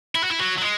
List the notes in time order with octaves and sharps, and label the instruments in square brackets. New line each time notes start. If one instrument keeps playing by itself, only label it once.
[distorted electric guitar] E4
F#4
E4
F#3
F#3
G#3